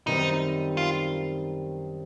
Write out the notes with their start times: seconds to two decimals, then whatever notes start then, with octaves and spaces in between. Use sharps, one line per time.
0.06 F#2 D#3 G3 C4 D#4
0.77 F4